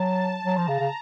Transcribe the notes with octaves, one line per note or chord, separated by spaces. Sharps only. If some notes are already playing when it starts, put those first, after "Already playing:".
Already playing: F#3 A5
F#3 A#5
F3
C#3
C#3